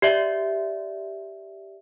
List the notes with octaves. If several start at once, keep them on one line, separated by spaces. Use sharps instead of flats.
G4 D5 E5